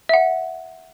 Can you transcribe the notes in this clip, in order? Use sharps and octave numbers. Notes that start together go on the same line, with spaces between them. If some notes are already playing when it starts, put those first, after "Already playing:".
E5 F#5